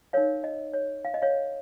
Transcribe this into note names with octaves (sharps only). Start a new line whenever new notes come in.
D#4 A#4 C#5 F5
D#5
C#5
F5
D#5
C#5 F5